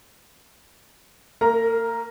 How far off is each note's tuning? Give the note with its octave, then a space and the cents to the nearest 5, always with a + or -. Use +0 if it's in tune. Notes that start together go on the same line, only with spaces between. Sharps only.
A#3 -40 A#4 +0 A#5 +5